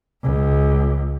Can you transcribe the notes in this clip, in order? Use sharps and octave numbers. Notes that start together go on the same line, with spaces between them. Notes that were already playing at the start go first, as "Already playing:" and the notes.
C#2